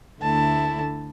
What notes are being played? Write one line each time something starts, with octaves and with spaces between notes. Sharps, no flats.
D2 D3 A3 E4 A5